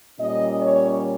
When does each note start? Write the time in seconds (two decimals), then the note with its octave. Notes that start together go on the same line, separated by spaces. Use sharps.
0.19 A#2 G3 C#4 D#5
0.59 C#5